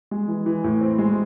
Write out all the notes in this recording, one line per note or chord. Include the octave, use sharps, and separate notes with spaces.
G#3
E3
E3
A2
C4
G#3